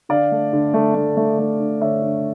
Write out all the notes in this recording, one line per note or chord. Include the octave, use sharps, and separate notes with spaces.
D3 D5 F5
A3
D3
A3
A3
A3
A3
D3
D3 C#5 E5
D3